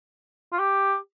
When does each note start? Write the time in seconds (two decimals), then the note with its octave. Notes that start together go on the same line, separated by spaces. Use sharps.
0.52 F4
0.59 G4